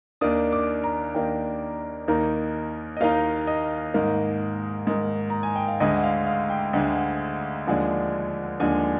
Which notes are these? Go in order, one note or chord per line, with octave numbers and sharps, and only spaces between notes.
D#2 D#3 A#3 D4 D#6
D6
A#5
D#2 D#3 A#3 D4 G5
D#2 D#3 A#3 D#4
D#5
D#2 D#3 A#3 D#4 F5
D#5
G#2 D#3 A#3
G#2 D#3 A#3
A#5
G#5
G5
F5
D2 D3 G#3 D#5
F5
F5
G5
D2 D3 G#3
D#2 D3 F3 G#3 D4
D#2 D3 F3 G#3 D4 G#5